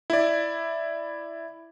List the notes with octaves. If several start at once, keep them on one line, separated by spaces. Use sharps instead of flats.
E4 D5